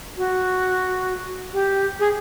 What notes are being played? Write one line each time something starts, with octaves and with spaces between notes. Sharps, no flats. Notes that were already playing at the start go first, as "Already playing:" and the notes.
F#4
G4
G#4